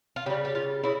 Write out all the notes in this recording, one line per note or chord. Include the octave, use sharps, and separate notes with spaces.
F4
C#3 G3 G4
G4
F4
C#3 E4